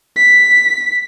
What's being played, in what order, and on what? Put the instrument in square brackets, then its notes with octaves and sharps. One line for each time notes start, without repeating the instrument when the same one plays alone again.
[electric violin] B6